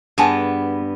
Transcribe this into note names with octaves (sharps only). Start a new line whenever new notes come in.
G2 B3 G#4 G#5 A5